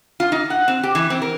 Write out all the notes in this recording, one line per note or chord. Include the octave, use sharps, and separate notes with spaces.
F4
D#4
F#5
C4
G4
E3
C4
A#4